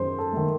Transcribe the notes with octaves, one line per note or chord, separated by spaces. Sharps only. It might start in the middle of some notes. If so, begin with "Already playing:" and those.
Already playing: F#2 D#3 G#4 C5
A4
D#3 A3